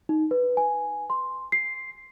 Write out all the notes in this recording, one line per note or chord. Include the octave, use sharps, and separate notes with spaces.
D#4
B4
G#5
C6
C7